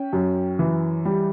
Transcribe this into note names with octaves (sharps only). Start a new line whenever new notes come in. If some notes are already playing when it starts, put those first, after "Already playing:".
Already playing: C#4 G5
F#2
E3
G3